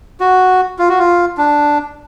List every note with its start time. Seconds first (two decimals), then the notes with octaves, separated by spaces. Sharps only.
0.20 F#4
0.79 F4
0.89 F#4
0.98 F4
1.37 D4